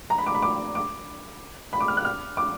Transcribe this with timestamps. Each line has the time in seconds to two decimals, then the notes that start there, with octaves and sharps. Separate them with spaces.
0.10 A#5
0.18 B5
0.26 D6
0.35 B5
0.42 D6
0.75 D6
1.73 B5
1.80 D6
1.88 F6
1.97 F#6
2.05 F6
2.37 D6